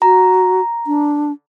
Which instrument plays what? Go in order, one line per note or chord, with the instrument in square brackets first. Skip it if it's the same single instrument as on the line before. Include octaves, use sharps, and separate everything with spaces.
[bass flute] F#4 [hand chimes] A#5
[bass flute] D4